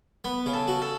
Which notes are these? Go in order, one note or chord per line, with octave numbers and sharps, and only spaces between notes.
B3 B4
C#3
A4
F#4
A4